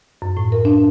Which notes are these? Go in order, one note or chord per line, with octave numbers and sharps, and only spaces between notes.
F#2
A2
A#4
D4